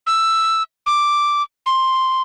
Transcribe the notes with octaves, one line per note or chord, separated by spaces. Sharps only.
E6
D6
C6